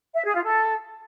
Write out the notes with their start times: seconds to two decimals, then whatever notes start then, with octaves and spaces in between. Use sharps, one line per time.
0.15 E5
0.25 G#4
0.34 F4
0.44 A4